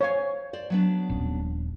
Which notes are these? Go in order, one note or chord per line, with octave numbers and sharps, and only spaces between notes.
C5 C#5 F5 G#5
C5 D5
F#3 B3 D4
D#1 A#1 C#4